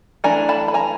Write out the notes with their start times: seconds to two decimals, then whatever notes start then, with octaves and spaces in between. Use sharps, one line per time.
0.24 E3 A3 D4 G#5 A#5
0.49 A5 B5
0.68 B5
0.74 G#5 A#5